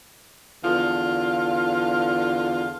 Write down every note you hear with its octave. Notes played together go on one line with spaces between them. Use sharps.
E2 D3 F4